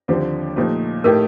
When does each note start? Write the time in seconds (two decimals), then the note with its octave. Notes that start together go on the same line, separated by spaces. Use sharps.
0.08 D#2 D3 F3 C4 G4
0.56 A#2 F3 A3 D#4 G4
1.04 A2 A3 D#4 G4 A#4